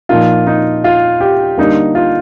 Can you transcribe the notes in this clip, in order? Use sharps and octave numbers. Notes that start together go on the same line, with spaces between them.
A#2 F3 A#3 D#4 F4
D#4
F4
G4
D3 G3 A#3 D#4
F4